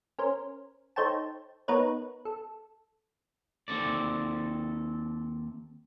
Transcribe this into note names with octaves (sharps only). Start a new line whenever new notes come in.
C#4 A#4 C5
D#4 A4 C5 C#5 G5 A5
B3 D#4 A#4 B4 C#5
A4
D#2 C4 A4 D5